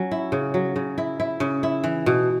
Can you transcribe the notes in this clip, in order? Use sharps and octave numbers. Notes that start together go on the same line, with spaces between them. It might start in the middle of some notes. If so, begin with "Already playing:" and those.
Already playing: F#3 C#4
E4
C#3
F#3
C#3
E4
E4
C#3
E4
E3
B2